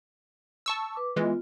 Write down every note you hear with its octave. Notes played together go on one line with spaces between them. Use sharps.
A5 C#6 E6
B4 D6
E3 G#3 B3 F4